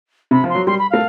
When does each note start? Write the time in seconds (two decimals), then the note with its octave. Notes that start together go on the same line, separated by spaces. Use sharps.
0.31 C3 B5
0.44 F3
0.49 C6
0.55 F#3
0.66 G3 C6
0.79 B5
0.90 A3 F5